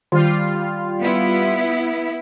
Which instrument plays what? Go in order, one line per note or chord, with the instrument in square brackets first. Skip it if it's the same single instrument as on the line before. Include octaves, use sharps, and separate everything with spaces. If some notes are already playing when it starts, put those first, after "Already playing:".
[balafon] D#3 [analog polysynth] G3 F4
[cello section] B3 E4